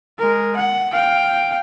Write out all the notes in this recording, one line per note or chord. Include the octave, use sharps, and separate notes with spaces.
G#3 A#4
F#5
F5 G5